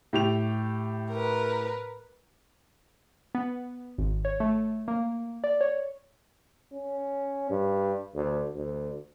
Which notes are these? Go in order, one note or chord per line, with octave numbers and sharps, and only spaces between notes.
A2 G4 F7
A#4 B4
B3
G#1
C#5
A3
A#3
D5
C#5
C#4
G2
D2
D2